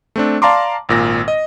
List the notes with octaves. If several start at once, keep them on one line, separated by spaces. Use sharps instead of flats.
A3 C4 D4
D5 F5 A5 A#5 C6 D6
G#1 A#2 A#6
D#5